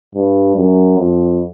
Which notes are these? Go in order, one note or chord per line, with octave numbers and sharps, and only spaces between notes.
G2
F#2
F2